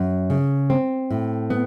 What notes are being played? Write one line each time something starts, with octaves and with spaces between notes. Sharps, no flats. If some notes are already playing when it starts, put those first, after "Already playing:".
Already playing: F#2
C#3
C4
A2
B3